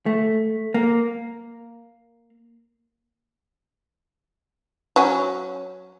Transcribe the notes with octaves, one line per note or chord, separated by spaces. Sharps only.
A3
A#3
F#3 C#4